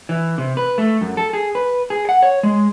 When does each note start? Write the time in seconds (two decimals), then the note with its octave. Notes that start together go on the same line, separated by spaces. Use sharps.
0.09 E3
0.38 C3
0.57 B4
0.78 A3
1.01 F#2
1.17 A4
1.33 G#4
1.55 B4
1.90 G#4
2.09 F#5
2.23 C#5
2.43 G#3